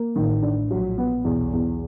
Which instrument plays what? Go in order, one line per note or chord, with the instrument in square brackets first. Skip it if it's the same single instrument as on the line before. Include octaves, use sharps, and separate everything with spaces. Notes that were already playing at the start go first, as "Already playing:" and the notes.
Already playing: [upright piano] A#3
[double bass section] A1 A2 [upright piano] D#3
[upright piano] D4
[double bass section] A#1 A#2 [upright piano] F#3
[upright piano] B3
[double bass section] B1 B2 [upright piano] E2
[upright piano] E2